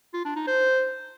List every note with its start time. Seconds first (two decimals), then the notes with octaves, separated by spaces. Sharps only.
0.14 F4
0.25 D4
0.36 D#4
0.47 C5